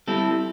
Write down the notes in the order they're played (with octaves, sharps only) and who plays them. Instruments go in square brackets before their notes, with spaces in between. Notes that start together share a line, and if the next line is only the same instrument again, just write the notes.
[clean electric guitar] G3 C4 E4 A4